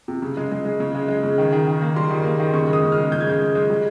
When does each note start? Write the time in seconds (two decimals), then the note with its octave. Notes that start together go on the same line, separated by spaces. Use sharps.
0.08 C3
0.22 C#3
0.37 G#3
0.52 G#3
0.65 G#3
0.80 C#3
0.95 G#3
1.08 G#3
1.23 C#3
1.38 D#3
1.52 D#3
1.67 D#3
1.81 A#3
1.96 G3 C6
2.11 D#3
2.24 A#3
2.39 D#3
2.54 C#3 C#6
2.69 G#3 D#6
2.83 C#3
2.92 F6
2.98 G#3
3.11 C#3 G6
3.21 G#6
3.27 G#3 G6
3.41 G#3
3.55 G#3
3.70 G3